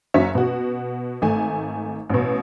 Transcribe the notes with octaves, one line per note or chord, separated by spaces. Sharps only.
F#1 F#3 C#4 E5
B2 F#4
G#1 A3 G#5
A1 B2